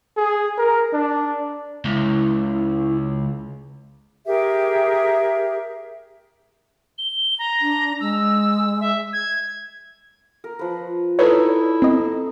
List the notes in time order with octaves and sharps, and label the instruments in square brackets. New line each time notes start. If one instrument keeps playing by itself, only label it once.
[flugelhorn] G#4
A#4
D4
[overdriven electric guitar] C#2 [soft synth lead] E4
[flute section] G4 G#4 A#4 E5
[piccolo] G7
A#5
[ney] D4
[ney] G#3 [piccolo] E6
[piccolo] E5
G#6
[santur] A#4
F3 B4
[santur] D#4 A4 [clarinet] E4 [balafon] B4 D5 [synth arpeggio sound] C#5
[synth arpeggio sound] C4 D#5